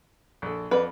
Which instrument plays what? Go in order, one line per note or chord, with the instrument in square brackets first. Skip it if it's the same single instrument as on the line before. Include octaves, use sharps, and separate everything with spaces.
[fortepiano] A#1 A4
[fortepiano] F2 D5 [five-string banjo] B4